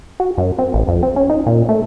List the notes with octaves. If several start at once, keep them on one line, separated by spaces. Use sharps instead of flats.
F#4
F#2
C4
A1
F2
C4
C#4
D#4
A#2
A3